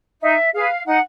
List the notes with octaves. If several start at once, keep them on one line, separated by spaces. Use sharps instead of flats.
D#4 E5
G#4 B4 F5
D#4 F#5